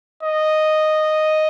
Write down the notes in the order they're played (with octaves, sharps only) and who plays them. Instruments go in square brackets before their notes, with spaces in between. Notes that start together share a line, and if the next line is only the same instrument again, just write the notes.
[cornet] D#5